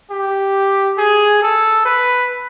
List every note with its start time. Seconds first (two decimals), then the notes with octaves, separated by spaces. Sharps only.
0.11 G4
0.98 G#4
1.42 A4
1.86 B4